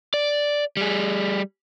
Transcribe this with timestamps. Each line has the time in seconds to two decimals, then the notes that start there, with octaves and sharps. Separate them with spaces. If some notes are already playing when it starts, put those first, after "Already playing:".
0.14 D5
0.77 G3 G#4